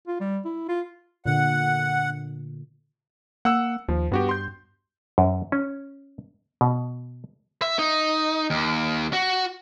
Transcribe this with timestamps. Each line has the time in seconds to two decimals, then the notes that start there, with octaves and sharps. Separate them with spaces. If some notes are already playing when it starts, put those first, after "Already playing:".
0.08 F4
0.21 G3
0.45 E4
0.69 F4
1.26 A#2 D3 F#5
3.45 A#3 F#5 E6
3.88 D#2 F3
4.12 G2 B3 F#4 G4
4.29 C6 G6
5.18 F#2
5.52 C#4
6.61 B2
7.62 E5
7.79 D#4
8.50 D#2
9.13 F#4